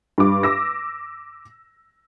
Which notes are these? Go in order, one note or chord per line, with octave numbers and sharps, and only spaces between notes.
G2 D6
D6 E6 A#6